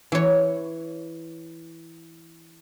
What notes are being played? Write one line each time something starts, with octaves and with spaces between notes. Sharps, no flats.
E3 C#5